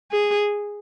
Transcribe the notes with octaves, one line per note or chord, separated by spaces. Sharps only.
G#4